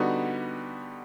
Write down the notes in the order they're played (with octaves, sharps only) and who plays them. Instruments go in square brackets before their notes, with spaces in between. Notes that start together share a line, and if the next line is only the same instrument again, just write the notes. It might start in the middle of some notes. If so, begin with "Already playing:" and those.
Already playing: [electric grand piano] D3 G3 B3 D#4 F#4